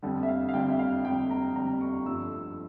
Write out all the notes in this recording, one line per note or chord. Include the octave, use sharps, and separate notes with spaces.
F2 D3 G3 A4
E5
F5
F5
F2 D3 G3 G5
E5
F5
F2 D3 G3 G5
A#5
F2 D3 G3 A#5
C#6
G2 F3 A3 E6
E6